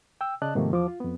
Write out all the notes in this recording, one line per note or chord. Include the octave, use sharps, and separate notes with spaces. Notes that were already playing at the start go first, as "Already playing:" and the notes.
G5 E6
C#3 D5 D#5 A5 F#6
G#2 C3 D#3 F3 A3 A#3
E2 F3 D6
F4
F2 B3